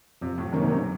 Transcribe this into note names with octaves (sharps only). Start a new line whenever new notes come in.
F2 C3
A2
F#2 C3 D#3 A#3 C#4
F#2